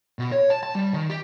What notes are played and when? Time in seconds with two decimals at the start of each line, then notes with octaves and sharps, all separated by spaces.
0.19 B2
0.32 C#5
0.50 A5
0.63 A5
0.75 G3
0.94 D#3
1.09 G4